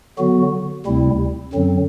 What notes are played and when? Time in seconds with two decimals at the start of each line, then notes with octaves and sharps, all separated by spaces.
0.18 D3 F#3 B3 F#4
0.86 D2 C3 G3 C4 E4
1.53 F#2 D3 F#3 C4